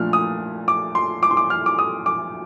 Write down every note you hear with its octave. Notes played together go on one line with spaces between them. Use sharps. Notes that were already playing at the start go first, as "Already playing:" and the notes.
Already playing: A#2 F3 A3 D4 F6
D#6
D6
C6
D6
C6
D6
F6
D6
D#6
D6